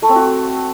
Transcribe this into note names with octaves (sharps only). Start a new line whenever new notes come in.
A3
C4
F#4